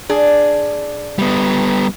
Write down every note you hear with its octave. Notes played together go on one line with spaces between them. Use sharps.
D4 G#4
G3 B3